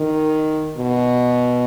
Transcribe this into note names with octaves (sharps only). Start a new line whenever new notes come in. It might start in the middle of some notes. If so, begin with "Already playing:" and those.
Already playing: D#3
B2